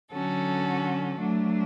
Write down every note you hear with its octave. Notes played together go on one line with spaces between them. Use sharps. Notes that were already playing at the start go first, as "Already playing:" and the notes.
D3 F#3 C#4 F#4 A4
F#3 A3 D4